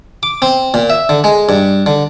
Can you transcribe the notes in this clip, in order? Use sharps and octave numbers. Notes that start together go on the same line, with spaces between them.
D6
C4
A#2
E5
D3
G#3
G2
D3